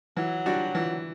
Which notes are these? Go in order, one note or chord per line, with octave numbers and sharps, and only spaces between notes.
E3 F#3
G3 D4 F#4
E3